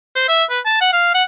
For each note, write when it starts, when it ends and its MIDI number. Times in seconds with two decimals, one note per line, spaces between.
0.16 0.24 72
0.29 0.44 76
0.50 0.60 71
0.65 0.77 81
0.81 0.90 78
0.93 1.13 77
1.15 1.23 78